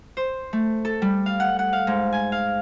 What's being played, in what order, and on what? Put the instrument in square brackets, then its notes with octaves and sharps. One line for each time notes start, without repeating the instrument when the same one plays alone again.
[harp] C5
A3
A4
G3
F5
F#5
F#5
F5
G#2
G#5
F5